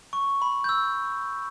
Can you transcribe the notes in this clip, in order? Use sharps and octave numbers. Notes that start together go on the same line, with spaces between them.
C#6
B5
G6
E6